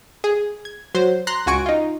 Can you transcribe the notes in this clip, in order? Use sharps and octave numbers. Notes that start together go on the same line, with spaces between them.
G#4
G#6
F#3 C5
A#5 C6 F#6 A#6
C#2 F#4 G#5 C#6 D7
D#4 F4